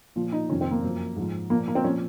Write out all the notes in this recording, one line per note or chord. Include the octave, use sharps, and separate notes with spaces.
A#2 F3 F4
D#4
F2 C3 D#3 C#4
C4
A#3
F#2 F3
G#2 F3
A#2 F3 A#3
A#3
C4
A#2 F3 C#4